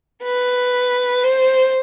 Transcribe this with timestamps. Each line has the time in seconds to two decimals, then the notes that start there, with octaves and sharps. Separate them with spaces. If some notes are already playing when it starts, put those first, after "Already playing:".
0.24 B4
1.24 C5